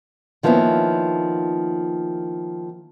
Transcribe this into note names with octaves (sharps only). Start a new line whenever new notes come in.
D#3 F3 A#3 B3 C#4 E4